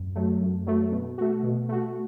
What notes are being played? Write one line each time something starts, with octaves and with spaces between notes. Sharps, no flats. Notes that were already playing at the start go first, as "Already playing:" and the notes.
Already playing: F#2
F#3 A3
F#2
F#3 A3
B2
A3 F#4
B2
A3 F#4